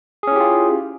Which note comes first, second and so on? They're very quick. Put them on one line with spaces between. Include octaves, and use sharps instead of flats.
G#4 C#4 E4 G4 F4